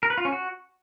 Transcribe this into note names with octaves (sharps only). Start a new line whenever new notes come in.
A#4
B4
F4
C#4
F#4